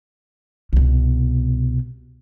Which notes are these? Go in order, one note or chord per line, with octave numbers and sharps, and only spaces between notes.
C2 B2